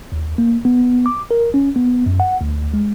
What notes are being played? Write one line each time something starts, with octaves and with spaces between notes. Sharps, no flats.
D#2
A#3
B3
D6
A#4
C#4
B3
F#2
F#5
D2
G#3